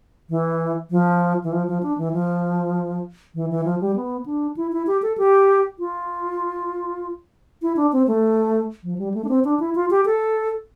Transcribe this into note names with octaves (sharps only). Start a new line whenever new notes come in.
E3
F3
E3
F3
F3
D4
E3
F3
E3
E3
F3
G3
B3
D4
E4
E4
G4
A4
G4
F4
E4
D4
C4
A3
F3
G3
A3
D4
C4
D4
E4
F4
G4
A4